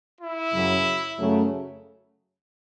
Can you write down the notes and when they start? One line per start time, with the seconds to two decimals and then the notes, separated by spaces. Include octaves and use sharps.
0.20 E4
0.53 F#2 C#3 F#3
1.19 F#2 C#3 F#3 A3